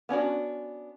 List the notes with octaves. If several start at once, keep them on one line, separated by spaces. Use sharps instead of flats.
B3 C#4 D4 F#4